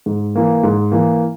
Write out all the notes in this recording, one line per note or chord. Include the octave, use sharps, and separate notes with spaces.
G#2
E3 A#3
G#2
E3 A#3